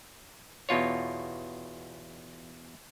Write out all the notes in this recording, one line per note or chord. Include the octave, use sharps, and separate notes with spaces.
E2 B2 F4 C#5